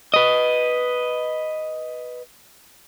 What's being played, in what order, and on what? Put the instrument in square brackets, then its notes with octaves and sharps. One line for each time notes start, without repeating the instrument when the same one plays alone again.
[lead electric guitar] B4 D#5